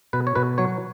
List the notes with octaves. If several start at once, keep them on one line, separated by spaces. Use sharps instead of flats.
B2 B4
C#5
B2 B4
F#3 C#5